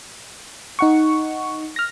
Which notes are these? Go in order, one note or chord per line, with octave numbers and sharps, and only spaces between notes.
D#4 F#5 C#6
F6 A#6